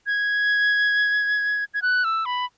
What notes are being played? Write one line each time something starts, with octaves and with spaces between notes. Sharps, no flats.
G#6
G#6
F#6
E6
B5